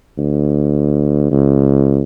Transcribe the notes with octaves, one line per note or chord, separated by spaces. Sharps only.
D2
C#2